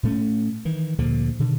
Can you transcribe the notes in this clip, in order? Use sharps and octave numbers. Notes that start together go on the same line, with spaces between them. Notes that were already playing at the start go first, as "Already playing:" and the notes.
A2 A3 C#4
D#3 E3
D2 A#2 D3 F3
B2 D3 D#3